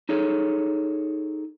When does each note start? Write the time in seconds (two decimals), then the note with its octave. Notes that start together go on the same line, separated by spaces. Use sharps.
0.09 D#4 G#4 A4 C#5